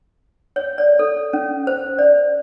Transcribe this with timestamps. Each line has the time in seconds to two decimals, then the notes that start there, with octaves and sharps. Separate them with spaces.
0.56 C#5
0.78 D5
0.99 A4
1.33 C#4
1.67 C5
1.99 D5